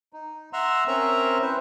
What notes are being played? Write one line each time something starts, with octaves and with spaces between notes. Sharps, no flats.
D#4
E5 F#5 A#5 C6 E6
C4 C#4 A#4 E5 A#5
E4 B4 C5